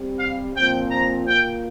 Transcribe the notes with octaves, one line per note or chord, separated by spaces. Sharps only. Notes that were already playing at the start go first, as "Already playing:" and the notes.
Already playing: C3 G3 C4
F5
A#2 F3 C4 G5
A#5
A#2 A#3 G5